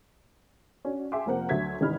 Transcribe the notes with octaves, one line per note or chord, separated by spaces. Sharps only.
C#4 D4 F#4
G#4 E5 G5 G#5 C6 D6
F1 F3 A#3 A#4 C5 F#5
D2 F#3 E5 G#6 B6
G#1 C3 E3 D#4 B5 F6